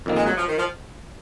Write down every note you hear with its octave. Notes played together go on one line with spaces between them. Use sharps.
F2 D#3 A#3
G#3
F#3
F3
D#3
F3